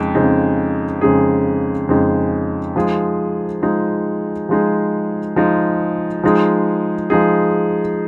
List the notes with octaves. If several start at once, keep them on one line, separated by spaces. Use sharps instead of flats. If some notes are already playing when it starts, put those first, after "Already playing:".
Already playing: F2 C#3 G#3 D#4 G#4
F2 C#3 G#3 D#4 G#4
F2 C#3 G#3 D#4 G#4
F2 C#3 G#3 D#4 G#4
F3 G#3 D#4 G#4
F3 G#3 D#4 G#4
F3 G#3 D#4 G#4
F3 G#3 D#4 G#4
F3 G#3 D#4 G#4
F3 G#3 D#4 G#4